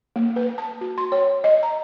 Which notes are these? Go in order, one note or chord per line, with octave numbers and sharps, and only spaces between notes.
A#3
B4
A5
F#4
C6
C#5
D#5
A#5